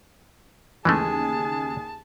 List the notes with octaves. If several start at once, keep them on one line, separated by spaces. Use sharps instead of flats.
D#2 C#3 E3 G#3 A3 G#4 A5